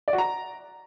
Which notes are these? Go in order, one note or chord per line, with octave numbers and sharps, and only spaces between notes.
D5
F#4
A#5